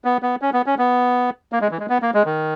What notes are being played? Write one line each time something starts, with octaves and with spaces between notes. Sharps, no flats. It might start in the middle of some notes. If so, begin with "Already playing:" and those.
B3
B3
C#4
B3
C#4
B3
A#3
G#3
E3
G#3
B3
A#3
G#3
D#3